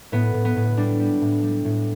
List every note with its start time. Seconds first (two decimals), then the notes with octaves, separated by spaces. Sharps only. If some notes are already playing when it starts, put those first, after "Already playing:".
0.12 A2 B3
0.34 A2
0.45 B3
0.56 A2
0.77 G3 D4
1.00 G3
1.21 A2
1.43 G3
1.65 A2